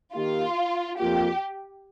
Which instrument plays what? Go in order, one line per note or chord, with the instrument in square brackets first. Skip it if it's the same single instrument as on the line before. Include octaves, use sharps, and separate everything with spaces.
[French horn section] D#3 A#3 G4 [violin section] F4
[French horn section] F2 F3 A#3 F4 [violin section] G4